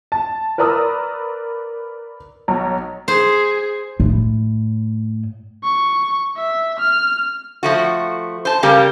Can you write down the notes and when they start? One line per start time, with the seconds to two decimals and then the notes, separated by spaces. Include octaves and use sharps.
0.12 A5
0.58 A#4 B4 D5 A#5 D#6 E6
2.48 B1 C#5 A#5
3.08 G#4 C5
4.00 A2
5.64 C#6
6.37 E5
6.79 F6
7.63 F3 A3 F#4
8.45 C5 A5
8.63 C#3 G3 A#3 G4